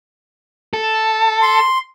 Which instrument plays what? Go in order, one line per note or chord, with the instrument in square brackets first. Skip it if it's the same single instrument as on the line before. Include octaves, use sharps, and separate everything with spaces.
[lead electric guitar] A4
[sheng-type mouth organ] C6